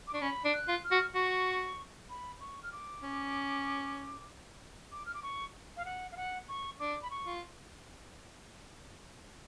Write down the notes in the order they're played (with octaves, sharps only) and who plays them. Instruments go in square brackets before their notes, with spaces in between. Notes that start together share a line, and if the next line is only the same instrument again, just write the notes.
[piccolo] D6
[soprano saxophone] D4 [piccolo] C#6
[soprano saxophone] C#4 [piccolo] B5
[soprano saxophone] D4
[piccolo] F#6
[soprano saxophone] F4
[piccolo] F6
[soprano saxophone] F#4
[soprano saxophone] F#4 [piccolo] C#6
[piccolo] B5
C#6
F6
D6
[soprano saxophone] C#4
[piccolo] D6
F6
D6
C#6
F5
F#5
F5
F#5
C#6
[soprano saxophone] D4 [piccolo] D6
[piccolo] B5
C#6
[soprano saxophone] F4